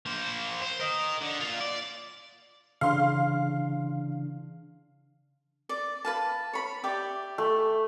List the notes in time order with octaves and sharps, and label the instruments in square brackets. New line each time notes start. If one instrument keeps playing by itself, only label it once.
[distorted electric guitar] A#3 C5
C5
A#4 D#5
D3
A#3 F4
D5
[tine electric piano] C#3 E3 D4 [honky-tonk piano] F5 C6
[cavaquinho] D5
B4 F5 A5
C#5 B5
G4 D5 E5
[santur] A3